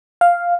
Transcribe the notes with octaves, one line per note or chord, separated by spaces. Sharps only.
F5